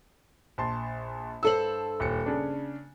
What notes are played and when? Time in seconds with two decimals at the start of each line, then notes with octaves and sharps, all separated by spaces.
0.58 A#1 A5 C6
1.43 G2 A4 C5 E6 E7 F#7
2.00 D#1 C#7
2.26 C#3 D4